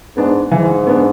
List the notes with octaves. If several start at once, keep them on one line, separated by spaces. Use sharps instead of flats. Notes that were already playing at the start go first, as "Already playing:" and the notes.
G#2 B3 D4
G#2 E3
B3 D4